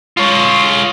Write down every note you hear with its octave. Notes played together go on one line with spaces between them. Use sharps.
F4 C#5